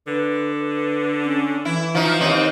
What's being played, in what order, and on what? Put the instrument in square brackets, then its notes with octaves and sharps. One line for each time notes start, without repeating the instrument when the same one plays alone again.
[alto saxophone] D3 [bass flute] B4
[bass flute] B4
C#4
[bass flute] E3 [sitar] E4
[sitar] F3 D#4
[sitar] D#2 C4 [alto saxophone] D#4